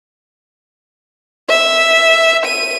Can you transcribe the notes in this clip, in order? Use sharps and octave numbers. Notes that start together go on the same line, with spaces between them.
E5
D#7